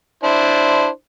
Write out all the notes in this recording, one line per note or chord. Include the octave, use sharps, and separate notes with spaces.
D4 E4 C5